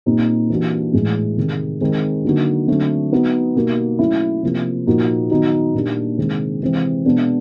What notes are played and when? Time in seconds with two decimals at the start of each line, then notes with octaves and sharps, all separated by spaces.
0.06 A#2 G3 C4 D#4
0.50 E3 G3 A#3 D4 F#4
0.93 A2 E3 G#3
1.37 C3 D#3 G#3
1.81 D#3 G#3 C4
2.25 D3 F#3 A#3 D#4 F#4
2.68 D3 F#3 A3 C4
3.12 F#3 B3 D#4 F#4
3.56 B2 G3 A#3 D#4 F#4
3.99 F#3 A3 C#4 E4
4.43 C3 F3 A#3
4.87 A#2 F3 A#3 D#4 F#4
5.30 D#3 F#3 B3 D#4 F#4
5.74 A#2 G3 A#3 D4
6.18 C3 D#3 G#3 C4
6.62 C3 E3 G#3 C4
7.06 B2 G#3 B3 D4